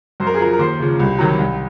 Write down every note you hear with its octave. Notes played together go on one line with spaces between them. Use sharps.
F#2 C5
A#4
G#4
F3 A#4
A#4
D#2 C5
C#3 F3
C2
C3 D#3 F#3
C2